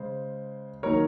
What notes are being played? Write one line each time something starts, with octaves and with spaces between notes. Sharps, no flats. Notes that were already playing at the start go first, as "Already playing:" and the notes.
Already playing: C#3 G#3 C5
D#3 F#3 A#3 A#4 C#5